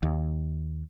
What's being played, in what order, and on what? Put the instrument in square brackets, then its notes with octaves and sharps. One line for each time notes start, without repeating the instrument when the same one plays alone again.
[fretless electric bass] D#2